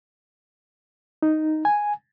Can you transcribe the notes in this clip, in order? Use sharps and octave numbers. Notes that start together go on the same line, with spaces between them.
D#4
G#5